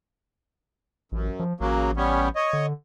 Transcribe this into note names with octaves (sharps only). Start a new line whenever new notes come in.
A1 F#2
F3
A1 C#3 F#3 A#3
G3 B3 C#4
C#5 D#5
D3